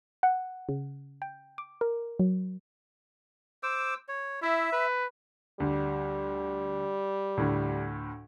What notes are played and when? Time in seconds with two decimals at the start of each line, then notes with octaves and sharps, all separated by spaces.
0.23 F#5
0.69 C#3
1.22 G5
1.58 D6
1.81 A#4
2.19 F#3
3.63 C5 D6 E6
4.09 C#5
4.42 E4 E5
4.72 B4
5.60 D2 G3
7.37 D2 A2